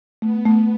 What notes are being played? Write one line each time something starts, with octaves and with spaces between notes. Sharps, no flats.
A3 B3
A3